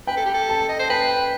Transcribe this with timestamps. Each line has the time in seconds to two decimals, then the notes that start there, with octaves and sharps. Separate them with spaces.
0.07 B4 G5
0.17 A4
0.25 G4
0.34 A4
0.49 A5
0.69 D#5
0.79 C5
0.89 B4 G5